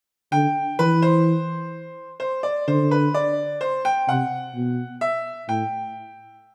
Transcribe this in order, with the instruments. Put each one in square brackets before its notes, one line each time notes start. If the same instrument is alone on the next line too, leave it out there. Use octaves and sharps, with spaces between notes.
[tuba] D3 [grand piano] G5
[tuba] E3 [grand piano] B4
[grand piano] C5
C5
D5
[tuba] D3 [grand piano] C5
[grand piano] B4
D5
C5
G5
[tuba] C3 [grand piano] F#5
[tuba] B2
[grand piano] E5
[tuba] A2 [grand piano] G5